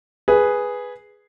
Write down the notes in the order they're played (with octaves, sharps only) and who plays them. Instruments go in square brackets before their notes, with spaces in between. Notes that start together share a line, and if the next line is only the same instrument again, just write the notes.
[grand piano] G#4 B4